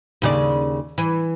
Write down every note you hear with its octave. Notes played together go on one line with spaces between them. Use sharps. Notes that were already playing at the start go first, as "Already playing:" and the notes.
D#2 C#3 D5
E3